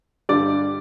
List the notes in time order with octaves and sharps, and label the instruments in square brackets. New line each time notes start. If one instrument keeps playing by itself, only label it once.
[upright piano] G2 D3 G3 D5